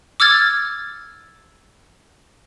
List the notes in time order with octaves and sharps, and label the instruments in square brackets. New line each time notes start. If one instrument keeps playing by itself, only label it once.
[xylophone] D6 E6 F6 G#6 A6